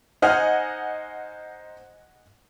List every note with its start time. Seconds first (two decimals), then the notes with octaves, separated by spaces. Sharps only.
0.22 D#4 C5 D#5 F#5 G#5 F6